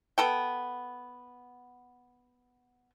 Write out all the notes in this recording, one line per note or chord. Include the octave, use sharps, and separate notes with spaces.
B3 A4 G5